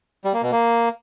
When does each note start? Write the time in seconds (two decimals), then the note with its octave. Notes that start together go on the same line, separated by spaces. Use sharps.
0.25 G3
0.34 A#3
0.43 B2
0.51 A#3